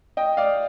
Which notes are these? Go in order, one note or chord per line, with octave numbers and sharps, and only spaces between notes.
D#5 G5
D5 F5